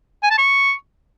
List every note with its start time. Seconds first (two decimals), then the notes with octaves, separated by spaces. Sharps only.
0.23 G#5
0.31 A5
0.38 C#6